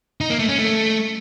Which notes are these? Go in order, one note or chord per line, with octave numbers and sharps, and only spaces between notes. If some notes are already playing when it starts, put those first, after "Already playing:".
D#4
A#3
A3
C#4
A3